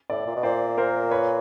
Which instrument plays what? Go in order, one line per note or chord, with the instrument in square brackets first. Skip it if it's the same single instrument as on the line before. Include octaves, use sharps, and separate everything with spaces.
[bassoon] A2 [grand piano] D5 E5
[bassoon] A#2
B2
[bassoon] A#2 [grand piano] C5 D5
[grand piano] A#4 C5
B4 C#5